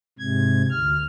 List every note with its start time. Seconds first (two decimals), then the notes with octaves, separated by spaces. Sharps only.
0.19 G#2 C3 G#6
0.70 D2 F6